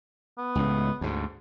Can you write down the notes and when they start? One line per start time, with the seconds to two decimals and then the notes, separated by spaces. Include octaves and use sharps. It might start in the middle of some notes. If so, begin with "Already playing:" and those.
0.38 B3
0.55 C#2 A2
1.01 D2 G#2